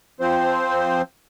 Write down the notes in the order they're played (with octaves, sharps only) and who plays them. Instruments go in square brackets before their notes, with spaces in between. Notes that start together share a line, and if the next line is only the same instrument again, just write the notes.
[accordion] F3 C4 C5